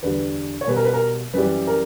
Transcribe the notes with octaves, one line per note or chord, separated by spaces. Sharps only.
E2 D3 G3 B4
C#5
B2 G3 B4
A#4
B4
A#4
F#2 E3 G3 B4
A#4